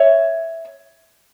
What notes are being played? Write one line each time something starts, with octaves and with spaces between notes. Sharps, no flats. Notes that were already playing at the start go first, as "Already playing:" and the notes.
Already playing: C#5 E5